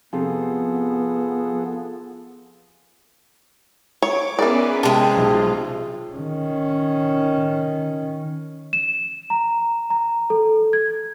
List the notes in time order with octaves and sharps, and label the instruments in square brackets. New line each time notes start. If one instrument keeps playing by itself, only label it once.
[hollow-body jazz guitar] F2 C3 [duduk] B3 [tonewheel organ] F4 G#4 A4
[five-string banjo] C#5 [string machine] D6
[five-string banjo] E3 D5 [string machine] B3 C#4 B4 [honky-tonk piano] G#4 A#4
[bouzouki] C3 G#3 [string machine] F4 [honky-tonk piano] A5
[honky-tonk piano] B1
[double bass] D#3 C#4
[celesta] E7
A#5
A#5
A4
G#6